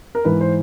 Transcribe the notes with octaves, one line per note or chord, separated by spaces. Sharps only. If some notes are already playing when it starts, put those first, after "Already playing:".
A#4
G#2 E3 B4
C5